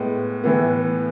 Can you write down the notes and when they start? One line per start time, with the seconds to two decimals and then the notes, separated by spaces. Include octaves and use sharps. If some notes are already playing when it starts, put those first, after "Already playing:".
Already playing: A2 G#3 B3
0.44 A2 E3 B3